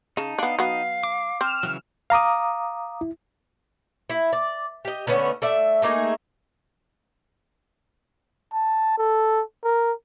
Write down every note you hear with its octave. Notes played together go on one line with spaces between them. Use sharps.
C#3 D#4 A5
B3 D4 F5
F#3 B3 F5
D6
C4 F6 E7
C#3 E3 F#3
F5 A#5 D6 D#6
E4
E4
D5
G4 D#5
D3 A3 B3 C#4
A3 D5 E5
A3 A#3 D#4 G#4
A5
A4
A#4